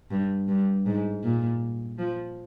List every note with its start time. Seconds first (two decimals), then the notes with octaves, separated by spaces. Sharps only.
0.11 G2
0.48 G2
0.86 G#2
1.23 A#2
1.98 F3